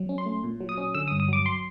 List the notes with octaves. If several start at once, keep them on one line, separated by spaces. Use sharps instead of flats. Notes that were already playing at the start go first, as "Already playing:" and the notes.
Already playing: F#3
C#4
C6
A3
A#2
F#3
D#6
C#4
D3 E6
D#6
G2
D#6
F#3 D6
C6